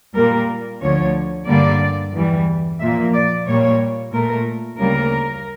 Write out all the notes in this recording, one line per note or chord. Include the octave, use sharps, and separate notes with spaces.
A#2 G3 A#3 A#4
D2 D3 F3 C#5
G2 D3 G3 A#3 D5
E2 E3 G3
A#2 F3 A#3 E5
D5
A#2 G3 A#3 C#5
A#2 A3 A#4
D2 C#3 G3 A#3 A#4